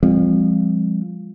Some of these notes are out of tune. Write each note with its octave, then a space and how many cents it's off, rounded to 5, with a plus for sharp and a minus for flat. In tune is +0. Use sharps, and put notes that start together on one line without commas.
F3 +0 G#3 -40 C4 +0